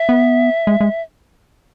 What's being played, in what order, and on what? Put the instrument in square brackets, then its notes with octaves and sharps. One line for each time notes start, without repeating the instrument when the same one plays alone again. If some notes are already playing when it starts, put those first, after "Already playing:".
Already playing: [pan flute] E5
[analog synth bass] B3
G#3
G#3